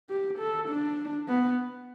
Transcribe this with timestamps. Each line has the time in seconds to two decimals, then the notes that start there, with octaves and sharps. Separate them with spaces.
0.10 G4
0.39 A4
0.69 D4
1.28 B3